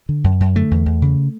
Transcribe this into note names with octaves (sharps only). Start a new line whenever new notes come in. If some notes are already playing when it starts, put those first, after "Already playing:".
D3
F#2
F#2
D3 A3
E2
E2
C#3